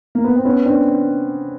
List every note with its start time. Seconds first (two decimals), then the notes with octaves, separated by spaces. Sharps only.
0.15 A#3
0.24 B3
0.36 C4
0.45 B3 C#4
0.65 C4 D4